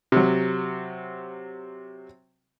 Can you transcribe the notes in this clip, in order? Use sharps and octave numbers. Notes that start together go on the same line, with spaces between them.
C3 F#3